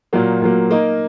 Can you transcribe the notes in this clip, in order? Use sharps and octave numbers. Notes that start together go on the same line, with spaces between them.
A#2 F#3 A#3
A#2 F#3 A#3
A#3 D#4 A#4 D#5